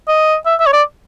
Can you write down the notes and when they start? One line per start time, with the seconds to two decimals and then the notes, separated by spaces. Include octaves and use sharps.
0.08 D#5
0.46 E5
0.60 E5
0.67 C#5
0.73 D5